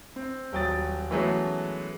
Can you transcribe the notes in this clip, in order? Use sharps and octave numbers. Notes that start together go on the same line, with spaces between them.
C4
D#1 F#3 G5 D#6 A6
E3 F#3 G#3 A3 B3 C#4